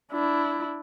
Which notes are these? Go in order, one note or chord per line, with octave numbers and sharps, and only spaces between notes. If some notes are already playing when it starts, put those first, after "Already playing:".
D4 E4